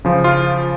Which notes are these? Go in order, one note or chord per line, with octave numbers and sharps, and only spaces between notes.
C#3 F3
F4